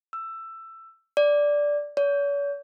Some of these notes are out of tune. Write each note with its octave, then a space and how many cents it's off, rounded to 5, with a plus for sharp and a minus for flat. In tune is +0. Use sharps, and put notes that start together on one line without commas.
E6 +15
D5 -5
C#5 +45